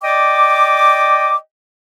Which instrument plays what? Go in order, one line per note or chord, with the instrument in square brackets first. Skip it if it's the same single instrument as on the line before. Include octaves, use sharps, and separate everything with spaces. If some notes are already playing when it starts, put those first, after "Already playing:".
[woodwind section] D5 D#5 G5 D6